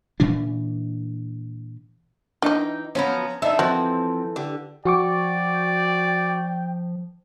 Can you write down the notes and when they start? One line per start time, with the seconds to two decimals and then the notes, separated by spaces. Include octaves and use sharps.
0.20 A#2 E3 C#4 D4
2.42 E3 D4 D#4 D#5 G5
2.95 F3 F#3 B3 C#4 A#5
3.42 D3 D#3 D#4 A4 E5
3.59 E3 F3 C4 F#4
4.36 D3 G4
4.85 F3 F#4 D5 G5 C#6 D6